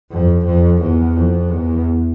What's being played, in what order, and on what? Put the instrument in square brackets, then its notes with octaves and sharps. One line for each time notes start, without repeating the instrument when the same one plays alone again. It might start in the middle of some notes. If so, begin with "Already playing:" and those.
[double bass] F2
F2
E2
F2
E2